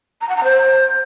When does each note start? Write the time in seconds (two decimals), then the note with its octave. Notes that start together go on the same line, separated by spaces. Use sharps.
0.21 A#5
0.29 F#5
0.37 A#5
0.44 C5